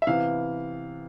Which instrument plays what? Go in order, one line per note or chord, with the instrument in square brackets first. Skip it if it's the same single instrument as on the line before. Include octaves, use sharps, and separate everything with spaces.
[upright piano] E5
C3 E3 B3 E4 F5